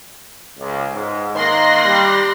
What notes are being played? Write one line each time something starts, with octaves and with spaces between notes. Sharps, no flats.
C#2
G#2
D#3 A#3 C6 F#6 A#6
G3